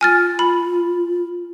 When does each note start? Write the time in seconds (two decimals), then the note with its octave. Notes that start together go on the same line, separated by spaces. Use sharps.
0.01 F4 G#5 F6 A6
0.39 B5